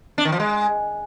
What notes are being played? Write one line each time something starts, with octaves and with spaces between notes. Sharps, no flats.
D4
D#3
F3
G#3